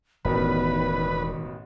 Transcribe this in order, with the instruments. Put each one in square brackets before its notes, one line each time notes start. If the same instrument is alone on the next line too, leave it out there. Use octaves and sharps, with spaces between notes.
[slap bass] E1 [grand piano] A1 B2 A#4 [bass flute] D#3 [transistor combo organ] B4